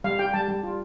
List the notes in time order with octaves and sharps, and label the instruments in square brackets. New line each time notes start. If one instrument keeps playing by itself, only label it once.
[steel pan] G3 F5
G4 G5
G3 A5
G3
F4